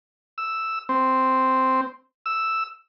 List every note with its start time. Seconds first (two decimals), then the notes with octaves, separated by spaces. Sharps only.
0.38 E6
0.89 C4
2.26 E6